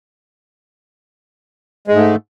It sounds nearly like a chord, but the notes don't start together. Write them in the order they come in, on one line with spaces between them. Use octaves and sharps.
G#3 G#2 A3